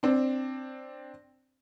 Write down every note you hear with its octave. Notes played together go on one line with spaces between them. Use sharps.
C4 D4